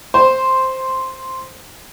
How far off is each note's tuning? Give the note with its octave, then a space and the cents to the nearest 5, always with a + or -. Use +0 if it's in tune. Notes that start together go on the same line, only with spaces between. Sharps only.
C5 +0